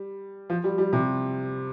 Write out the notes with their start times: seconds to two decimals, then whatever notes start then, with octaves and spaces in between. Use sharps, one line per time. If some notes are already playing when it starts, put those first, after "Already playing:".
Already playing: G3
0.50 F3
0.64 G3
0.78 G3
0.93 C3